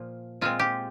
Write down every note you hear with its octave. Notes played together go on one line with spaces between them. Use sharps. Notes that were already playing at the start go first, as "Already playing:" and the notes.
Already playing: A#2 F3
A#2 G#3 C4 F4
G4